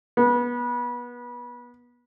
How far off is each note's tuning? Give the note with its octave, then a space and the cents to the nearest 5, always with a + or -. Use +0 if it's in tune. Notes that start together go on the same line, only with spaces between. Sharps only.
B3 -25